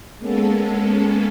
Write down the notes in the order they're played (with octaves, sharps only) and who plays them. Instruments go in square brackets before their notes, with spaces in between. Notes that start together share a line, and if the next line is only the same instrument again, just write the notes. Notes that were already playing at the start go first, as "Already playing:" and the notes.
[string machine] G#3 A#3 B3 C#4 A4